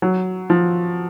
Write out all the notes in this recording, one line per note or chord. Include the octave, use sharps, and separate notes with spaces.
F#3
F3